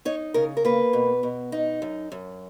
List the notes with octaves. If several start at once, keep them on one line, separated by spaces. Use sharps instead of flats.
D#4 C#5
C#3 A#4
A#4
A#3 B4
B2
B2
D#4
F#2
F#2